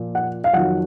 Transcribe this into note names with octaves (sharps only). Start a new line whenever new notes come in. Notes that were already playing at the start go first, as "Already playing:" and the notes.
Already playing: A#2 F3
F#5
F5
F2 D#3 F#3 F#5